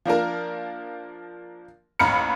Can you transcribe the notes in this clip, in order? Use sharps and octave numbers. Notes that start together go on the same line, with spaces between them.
F3 A#3 D4 A#4
A1 D#2 A#5 B5 F6 C#7